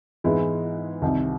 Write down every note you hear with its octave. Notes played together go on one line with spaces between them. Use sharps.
G#2 E3 G#3 B3 E4
C2 C3 D#3